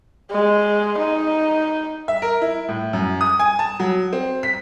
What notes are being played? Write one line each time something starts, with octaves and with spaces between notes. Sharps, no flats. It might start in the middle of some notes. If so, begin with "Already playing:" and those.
G#3
D#4
E5
A#4
E4
A2
F#2
D#6
G#5
A5
F#3
C4
B6